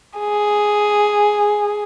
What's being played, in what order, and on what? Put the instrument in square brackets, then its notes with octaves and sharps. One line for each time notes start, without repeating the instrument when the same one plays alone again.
[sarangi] G#4